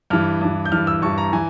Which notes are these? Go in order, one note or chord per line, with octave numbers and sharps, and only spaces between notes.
G2 E3 F6
G2 E3
G6
G2 E3 F6
E6
G2 E3 C#6
A#5
E3 G#5